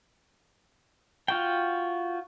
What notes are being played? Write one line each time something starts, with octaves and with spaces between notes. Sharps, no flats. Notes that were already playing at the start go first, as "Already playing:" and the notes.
F4 F#4 G5